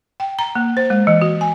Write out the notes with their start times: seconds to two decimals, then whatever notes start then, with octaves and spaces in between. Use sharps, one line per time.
0.20 G5
0.39 A#5
0.55 A#3
0.77 C5
0.90 G#3
1.07 E3
1.22 F#4
1.41 G#5